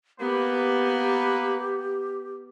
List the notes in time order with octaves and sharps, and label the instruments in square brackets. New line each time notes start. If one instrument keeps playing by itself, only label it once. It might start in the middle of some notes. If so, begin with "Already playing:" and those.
[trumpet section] A#3 B4 [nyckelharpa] B3 [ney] G4